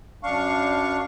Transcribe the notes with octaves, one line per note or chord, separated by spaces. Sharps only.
F#2 D4 F5 C#6